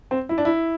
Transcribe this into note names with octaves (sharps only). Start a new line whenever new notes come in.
C4
E4
D4
E4